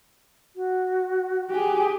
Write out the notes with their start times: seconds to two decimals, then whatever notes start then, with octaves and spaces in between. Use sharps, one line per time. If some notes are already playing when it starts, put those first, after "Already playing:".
0.56 F#4
1.51 G4 G#4